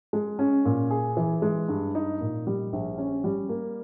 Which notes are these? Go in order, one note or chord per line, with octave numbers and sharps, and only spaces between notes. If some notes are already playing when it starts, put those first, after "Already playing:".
G#3
C#4
A#2
G#4
E3
G#3
G2
D#4
A#2
G3
A#1
C#4
G3
A#3